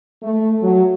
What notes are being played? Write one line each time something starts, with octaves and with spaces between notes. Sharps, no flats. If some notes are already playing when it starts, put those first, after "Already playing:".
A3
F#3